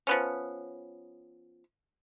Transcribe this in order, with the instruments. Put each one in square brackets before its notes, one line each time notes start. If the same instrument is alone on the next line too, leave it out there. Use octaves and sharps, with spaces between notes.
[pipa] F3 B3 C#4